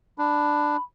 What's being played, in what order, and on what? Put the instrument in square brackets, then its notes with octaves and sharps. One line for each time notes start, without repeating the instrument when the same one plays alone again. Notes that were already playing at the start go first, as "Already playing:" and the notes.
[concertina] D4 [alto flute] B5